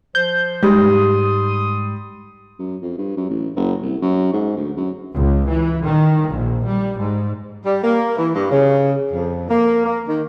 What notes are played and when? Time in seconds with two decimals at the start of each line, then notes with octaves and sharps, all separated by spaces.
0.15 F3 C5 G6
0.63 G#2 G3 C6 D#6
2.59 F#2
2.81 F2
2.98 G2
3.16 F#2
3.29 A1
3.56 F#1
3.82 C2
4.02 F#2
4.33 G#2
4.56 D2
4.77 F#2
5.15 C#2
5.48 E3
5.85 D#3
6.30 A#1
6.65 G3
6.99 G#2
7.65 G3
7.83 A#3
8.17 E3
8.35 G2
8.51 C#3
9.13 F2
9.49 A#3
9.85 A#3
10.07 D#3